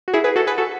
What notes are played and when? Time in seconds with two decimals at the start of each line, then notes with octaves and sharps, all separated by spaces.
0.08 F#4
0.13 E4 G#4
0.24 G#4 B4
0.36 F#4 A4
0.47 G#4 B4
0.58 F#4 A4